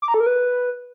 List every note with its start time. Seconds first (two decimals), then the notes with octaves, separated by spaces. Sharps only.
0.02 D6
0.08 A#5
0.14 A4
0.20 A#4
0.26 B4